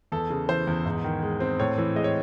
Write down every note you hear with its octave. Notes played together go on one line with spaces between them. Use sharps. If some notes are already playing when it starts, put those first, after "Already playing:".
E2 A4
C#3
E3 C5
E2
G#2
D#3
G#3
C4
A2 C#5
E3
G#3 D#5
C#5